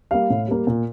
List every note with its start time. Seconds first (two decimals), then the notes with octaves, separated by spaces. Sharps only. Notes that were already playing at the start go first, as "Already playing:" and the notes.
0.11 G3 A#3 F5
0.30 A2
0.48 G3 A#3
0.67 A#2